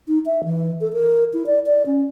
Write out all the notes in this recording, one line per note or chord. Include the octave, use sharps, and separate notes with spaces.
D#4
E5
E3
A4
A#4
E4
D5
D5
C#4